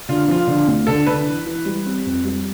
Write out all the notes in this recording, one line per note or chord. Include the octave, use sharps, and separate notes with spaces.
D3 F4
F3 F4
D3
D2
D3 A4
D3 B4
E3
E3
G3
C4
F2
G3